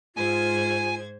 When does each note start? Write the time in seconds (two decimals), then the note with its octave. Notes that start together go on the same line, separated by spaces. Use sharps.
0.16 G#2 F4 C5 G#5 G#6